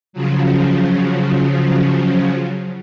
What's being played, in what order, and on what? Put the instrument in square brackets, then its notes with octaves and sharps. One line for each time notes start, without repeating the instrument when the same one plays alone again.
[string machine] C#3 F3 F#3